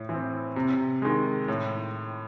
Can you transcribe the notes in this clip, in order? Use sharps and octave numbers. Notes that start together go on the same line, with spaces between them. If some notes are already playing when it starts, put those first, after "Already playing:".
Already playing: A2
E3
C4
C3
D#3 G#3
A2